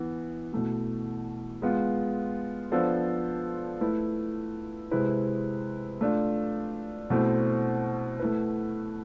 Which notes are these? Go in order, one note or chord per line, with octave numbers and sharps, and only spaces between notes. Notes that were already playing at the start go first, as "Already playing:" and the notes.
Already playing: E3 B3 E4
B2 A3 E4
G#3 B3 F4
F3 B3 D4 A4 C5
A3 E4 B4
C3 G#3 C4 E4 B4
A3 D4 F4
B2 A3 C4 E4
A3 E4 B4